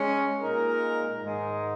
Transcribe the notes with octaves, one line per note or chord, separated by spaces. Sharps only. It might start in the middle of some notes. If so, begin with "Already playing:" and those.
Already playing: G#3 C#4
A#2 G#3 D#4 A#4
G#2 D#3 G#3 D#4